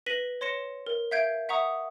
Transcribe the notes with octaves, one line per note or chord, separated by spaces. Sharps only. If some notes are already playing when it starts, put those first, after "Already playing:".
B4 A#6 B6 D#7 F#7
C#5 C6 A#6 C#7 E7
A#4
E5 F5 G6 G#6 D7
E5 F#5 A#5 C#6 D#6